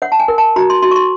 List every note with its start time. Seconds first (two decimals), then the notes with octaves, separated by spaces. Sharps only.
0.02 C#5 F#5
0.12 A5
0.20 G#5
0.28 A#4
0.38 A5
0.56 F#4 A#5
0.70 C6
0.82 F#4 C6
0.91 C#6
0.96 C6